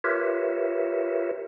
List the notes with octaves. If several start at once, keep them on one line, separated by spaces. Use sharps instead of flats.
F4 G4 A#4 B4 C#5 E5